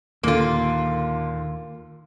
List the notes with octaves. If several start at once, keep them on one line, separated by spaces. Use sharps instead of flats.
D#2 A#2 D3 A#3 F4